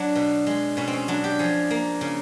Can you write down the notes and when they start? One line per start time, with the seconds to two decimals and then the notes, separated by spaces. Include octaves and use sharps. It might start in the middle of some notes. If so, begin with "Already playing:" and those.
Already playing: F#3 D4 F#4
0.15 B2
0.47 G#3
0.77 B2 C#4
0.88 C4
0.93 C#4
1.08 F#3 D4
1.24 G4
1.39 F3 G#4
1.70 A#3
2.01 C#3